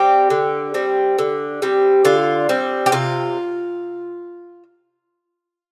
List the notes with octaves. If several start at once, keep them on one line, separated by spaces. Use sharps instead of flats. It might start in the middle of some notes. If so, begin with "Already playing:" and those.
Already playing: G3 C4 G4
D3
G3 C4
D3
G3 C4
D3 F4
G3 C4
G4
C3 F4